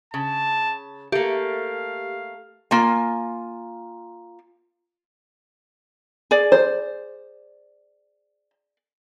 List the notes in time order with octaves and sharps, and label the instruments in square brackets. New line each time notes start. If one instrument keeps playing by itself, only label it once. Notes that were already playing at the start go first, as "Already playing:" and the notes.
[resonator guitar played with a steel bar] C#3 [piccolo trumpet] A5
[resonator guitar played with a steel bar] A3 A#3 [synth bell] G4 [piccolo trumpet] F5
[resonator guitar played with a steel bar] A#3 F4 G#5
[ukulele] G#4 D5
[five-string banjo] C5